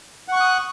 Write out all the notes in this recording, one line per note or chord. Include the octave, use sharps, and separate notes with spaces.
F#5 C#6 D#6 F#6